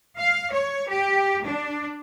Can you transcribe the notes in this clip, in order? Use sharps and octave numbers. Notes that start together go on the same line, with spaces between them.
F5
C#5
G4
D4